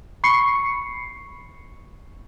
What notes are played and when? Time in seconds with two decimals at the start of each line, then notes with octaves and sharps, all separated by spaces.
0.24 B5 C#6 C7 C#7